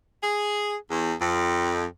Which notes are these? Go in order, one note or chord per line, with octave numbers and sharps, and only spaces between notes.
G#4
E2
F2